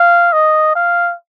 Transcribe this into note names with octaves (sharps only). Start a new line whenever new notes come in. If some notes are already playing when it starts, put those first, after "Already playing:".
Already playing: F5
D#5
F5